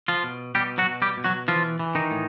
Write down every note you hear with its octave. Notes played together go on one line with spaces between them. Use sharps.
F3 F4
B2
B2 G3 G4
F#3 F#4
B2
G3 G4
B2
F#3 F#4
E3 F3 F4
E3
D#3 D#4
A2